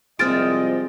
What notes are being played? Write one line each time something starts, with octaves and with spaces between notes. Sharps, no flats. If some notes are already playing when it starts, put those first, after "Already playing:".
C2 F3 G#3 C4 D#5 F6 A6 D7